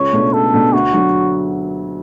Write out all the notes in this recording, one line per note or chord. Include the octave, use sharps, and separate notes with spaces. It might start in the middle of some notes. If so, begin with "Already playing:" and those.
Already playing: C#2 C#5
B2 A3 D4
C#2 A4
B2 A3 D4
D2 F#4
D3 F#3